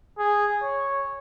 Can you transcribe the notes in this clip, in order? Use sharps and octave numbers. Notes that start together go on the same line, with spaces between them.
G#4
C#5